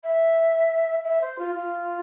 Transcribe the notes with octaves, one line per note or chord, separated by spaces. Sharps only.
E5
E5
C5
F4
F4